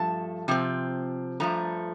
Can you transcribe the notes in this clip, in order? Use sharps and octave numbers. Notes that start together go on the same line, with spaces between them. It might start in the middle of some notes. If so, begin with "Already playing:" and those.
Already playing: G2 F3 A3 A5
C3 F3 C4
G2 F3 A3 A#5